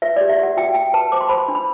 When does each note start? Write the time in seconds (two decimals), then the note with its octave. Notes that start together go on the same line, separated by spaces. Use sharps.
0.02 B4 E5
0.16 G4 D5
0.29 E5
0.39 G4 F#5
0.57 F#4 G5
0.75 F#4 G5
0.94 B4 A5
1.12 C5 D6
1.21 C6
1.29 C5 B5
1.37 C6
1.48 D4
1.55 B5